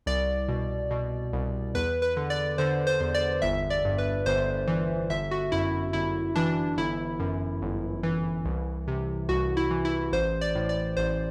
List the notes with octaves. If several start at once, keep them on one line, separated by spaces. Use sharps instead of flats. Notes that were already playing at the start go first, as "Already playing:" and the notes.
C2 D5
B2
B2
C2
E2 B4
B4
D3
D5
D3 C5
C5
E2
D5
G1 E5
D5
G2
B4
G1 C5
E3
G1 E5
F#4
F#2 E4
G1 E4
E3 D4
G1 E4
F#2
G1
E3
C2
C3
C2 F#4
E4
E3
E4
A1 C5
D5
A2
D5
A1 C5